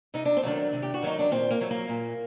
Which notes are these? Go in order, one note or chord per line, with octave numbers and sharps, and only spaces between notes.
C3 D#4
D4
C4
D#3 F#3 A3 D4
C3
G4
F#4
D#3 F#3 A3 D#4
D4
A#2 C4
A#3
F#3 A3
A#3
A#2